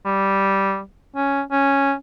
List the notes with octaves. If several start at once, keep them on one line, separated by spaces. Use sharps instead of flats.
G3
C#4
C#4